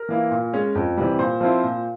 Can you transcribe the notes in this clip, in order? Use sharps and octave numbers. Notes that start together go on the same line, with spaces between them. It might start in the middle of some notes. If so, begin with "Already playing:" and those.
Already playing: A#4
E3 A#3 E4
A#2
G#3 C#4
F2
C3 E3 G3
A#2 C5
F3 C4 E4
A#2